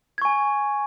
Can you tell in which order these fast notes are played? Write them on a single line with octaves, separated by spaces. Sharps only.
G#6 C#6 G#5